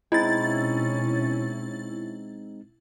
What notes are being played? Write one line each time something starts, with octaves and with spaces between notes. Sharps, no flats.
B2 G#3 C4 C#4 D#4 E4 A6